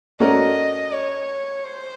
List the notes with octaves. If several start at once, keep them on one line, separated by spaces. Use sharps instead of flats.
A3 C#4 F#4 A#4 D5 D#5
C#5
C5